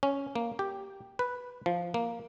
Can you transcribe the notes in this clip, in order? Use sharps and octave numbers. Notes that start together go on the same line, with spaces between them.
C#4
A#3
G4
B4
F3
A#3